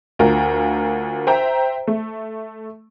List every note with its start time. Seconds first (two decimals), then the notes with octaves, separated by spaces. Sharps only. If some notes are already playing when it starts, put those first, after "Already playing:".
0.19 D2 F4 A#4
1.27 C5 E5 G5 A#5
1.87 A3